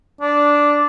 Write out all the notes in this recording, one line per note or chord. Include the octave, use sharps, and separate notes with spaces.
D4